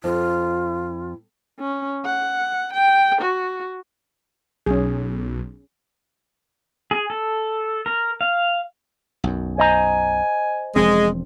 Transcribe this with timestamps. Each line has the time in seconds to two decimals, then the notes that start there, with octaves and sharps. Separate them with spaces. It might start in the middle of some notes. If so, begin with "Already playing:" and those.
0.04 F2 F4
1.59 C#4
2.05 F#5
2.73 G5
3.21 F#4
4.66 B1 C#4 G#4
6.91 G#4
7.10 A4
7.86 A#4
8.21 F5
9.24 B1 F#2
9.58 C5 D#5 G#5 A#5
10.76 E1 F3 G#3 C4